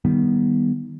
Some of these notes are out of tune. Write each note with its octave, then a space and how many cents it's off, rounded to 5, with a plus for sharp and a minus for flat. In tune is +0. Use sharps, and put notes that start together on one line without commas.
D#3 +0 G3 +0 B3 -15